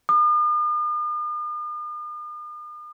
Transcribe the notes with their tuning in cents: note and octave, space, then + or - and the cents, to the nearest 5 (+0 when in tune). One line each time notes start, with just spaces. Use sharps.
D#6 -45